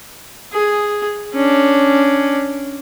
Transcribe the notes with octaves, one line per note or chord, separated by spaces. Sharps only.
G#4
C#4 D4